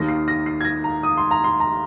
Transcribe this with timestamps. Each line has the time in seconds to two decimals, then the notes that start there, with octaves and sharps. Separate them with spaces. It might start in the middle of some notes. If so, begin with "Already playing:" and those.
Already playing: D#2 D#3 A#3 A#6
0.08 C7
0.28 A#6
0.46 C7
0.61 G#6
0.65 A#6
0.84 A#5
1.03 D#6
1.17 C6
1.31 A#5
1.44 C6
1.60 A#5